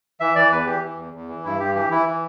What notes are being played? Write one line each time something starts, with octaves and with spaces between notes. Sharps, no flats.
E3 E5
E3 D5
E2 B4
E3 G4
E3
E2
E2
E3
G2 E4
G2 G4
E3 G4
E3 E4
E3